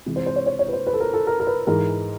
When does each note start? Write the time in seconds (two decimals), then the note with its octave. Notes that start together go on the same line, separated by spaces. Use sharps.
0.06 C3 E3 G#3
0.16 C5
0.26 C5
0.36 C#5
0.46 C#5
0.59 C#5
0.68 B4
0.73 C5
0.87 B4
0.93 A4
1.00 A#4
1.13 A4
1.27 A#4
1.40 A#4
1.47 B4
1.67 G#2 E3 G#3 A#4